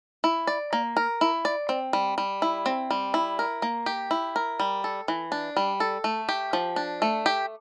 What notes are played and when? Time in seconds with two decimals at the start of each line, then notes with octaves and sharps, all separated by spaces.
0.24 E4
0.47 D5
0.73 A#3
0.97 A#4
1.21 E4
1.45 D5
1.69 C4
1.93 G3
2.18 G3
2.42 E4
2.66 C4
2.91 G3
3.14 E4
3.39 A#4
3.62 A#3
3.86 G4
4.11 E4
4.36 A#4
4.60 G3
4.84 A4
5.08 E3
5.32 D4
5.57 G3
5.80 A4
6.04 A3
6.29 G4
6.53 F3
6.76 D4
7.02 A3
7.26 G4